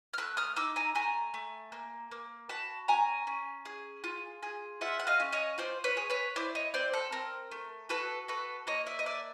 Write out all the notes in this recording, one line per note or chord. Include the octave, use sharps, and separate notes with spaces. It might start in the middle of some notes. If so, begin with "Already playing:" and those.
F6
A3 E6 F#6
D#6 F6
D#4 D6 E6
G#5 A#5
A3 G#5 A#5
A3
A#3
A#3
F#4 A5 B5
C#4 G#5 A#5
C#4
G#4
F4
G#4
F4 E5 F#5
F#5
D#5 F5
C#4
C#5 D#5
F4 C5 D5
B4 C#5
G#4
B4 C#5
E4 C5 D5
C#5 D#5
C4 C5 D5
A4
C4 A#4
A3
F#4 A4 B4
F#4 A4 B4
A#3 C#5 D#5
D5 E5
D#5
D4 D5 E5